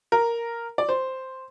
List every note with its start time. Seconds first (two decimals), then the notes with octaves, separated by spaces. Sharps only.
0.12 A#4
0.78 D5
0.89 C5